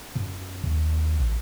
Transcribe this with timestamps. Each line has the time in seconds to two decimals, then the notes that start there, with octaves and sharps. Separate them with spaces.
0.15 F#2
0.64 D#2
1.20 A1